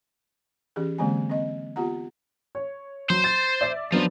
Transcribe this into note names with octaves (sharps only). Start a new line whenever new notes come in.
E3 C#4 G4 G#4
D3 E3 G#3 A#3 C4 G#5
C4 D#5
B3 F4 G4 F#5 A#5
C#5
F#3 C5 C6
A6
D5 E5 D6
F3 F#3 B3 D4